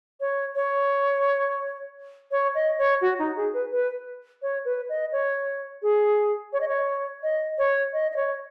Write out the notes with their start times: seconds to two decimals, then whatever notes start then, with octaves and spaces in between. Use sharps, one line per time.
0.20 C#5
0.55 C#5
2.31 C#5
2.55 D#5
2.78 C#5
3.02 F#4
3.19 D#4
3.36 G#4
3.54 B4
3.72 B4
4.42 C#5
4.65 B4
4.89 D#5
5.12 C#5
5.82 G#4
6.53 C#5
6.61 D#5
6.68 C#5
7.23 D#5
7.58 C#5
7.93 D#5
8.12 D#5
8.16 C#5